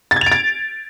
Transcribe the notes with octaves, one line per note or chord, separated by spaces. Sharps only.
A6
G#6
F7
D7
A6